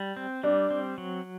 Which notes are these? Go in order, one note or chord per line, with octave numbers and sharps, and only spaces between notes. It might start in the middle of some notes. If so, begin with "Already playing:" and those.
Already playing: G3
C4
G3 D4
C4
F#3